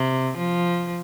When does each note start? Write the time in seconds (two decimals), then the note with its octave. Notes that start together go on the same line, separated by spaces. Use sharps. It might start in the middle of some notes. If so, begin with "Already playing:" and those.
Already playing: C3
0.37 F3